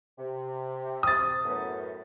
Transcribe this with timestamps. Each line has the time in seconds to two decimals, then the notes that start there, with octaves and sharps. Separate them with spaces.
0.18 C3
1.03 D#6 A6
1.45 F#2 A2 B3